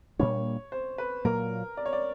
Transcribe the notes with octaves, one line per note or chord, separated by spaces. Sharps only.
A#2 G3 A#3 D4 C#5
C5
B4
A#2 F#3 A#3 A#4
D5
C#5
D5